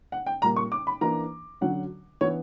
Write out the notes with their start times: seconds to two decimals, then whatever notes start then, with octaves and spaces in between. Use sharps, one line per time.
0.12 F#5
0.26 G5
0.42 A#2 G3 A#3 A#5
0.56 C#6
0.72 D6
0.87 B5
1.01 E3 A#3 D4 A#5
1.61 D3 F#3 C#4 F#5
2.21 E3 B3 D4 C#5